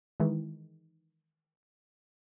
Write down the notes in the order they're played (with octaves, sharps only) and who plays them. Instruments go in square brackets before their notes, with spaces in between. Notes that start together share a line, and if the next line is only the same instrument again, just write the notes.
[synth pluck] D#3 E3 G#3